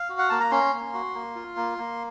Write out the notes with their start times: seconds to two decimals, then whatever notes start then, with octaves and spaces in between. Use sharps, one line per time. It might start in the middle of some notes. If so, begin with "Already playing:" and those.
Already playing: F5
0.10 F#4
0.19 F#5
0.30 A#3 A5
0.40 A#5
0.51 C#4 C6
0.73 A#3
0.94 F#4
1.15 A#3
1.36 F4
1.57 A#3
1.78 A#3